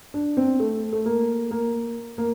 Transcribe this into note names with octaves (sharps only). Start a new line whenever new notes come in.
D4
C4
A3
A3
A#3
A#3
A#3